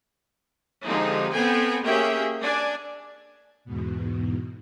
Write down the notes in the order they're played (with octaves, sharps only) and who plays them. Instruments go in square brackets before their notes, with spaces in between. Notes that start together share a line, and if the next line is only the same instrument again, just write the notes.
[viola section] D3 F3 G#3 C4 D#4 G4
B3 C4 A4 B4 G5 G#5
A#3 C#4 G4 G#4 E5 G5
D4 D5 G#5
[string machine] E2 G#2 B2